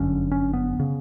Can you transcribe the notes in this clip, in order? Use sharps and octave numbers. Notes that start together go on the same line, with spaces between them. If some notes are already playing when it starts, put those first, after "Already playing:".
Already playing: G1 F#2 D3 C#4
C#4
B3
C#3